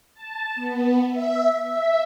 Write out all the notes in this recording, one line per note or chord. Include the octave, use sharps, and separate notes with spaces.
A5
B3
E5
E5